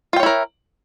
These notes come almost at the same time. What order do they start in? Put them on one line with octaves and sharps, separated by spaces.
F4 G5 C#5 E4 A#4